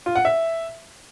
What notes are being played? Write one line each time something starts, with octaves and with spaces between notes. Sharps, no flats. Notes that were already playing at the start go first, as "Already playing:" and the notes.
F4
F#5
E5